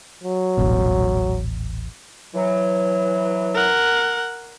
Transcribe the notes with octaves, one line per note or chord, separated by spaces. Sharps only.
F#3
D#1 A1 B2
E3 F#3
A#4 F#5